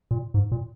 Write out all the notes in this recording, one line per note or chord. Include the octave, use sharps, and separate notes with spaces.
A#2
G#2
A#2